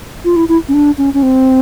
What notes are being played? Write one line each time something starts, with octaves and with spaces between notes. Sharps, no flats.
F4
E4
E4
C#4
D4
C#4
C#4
C4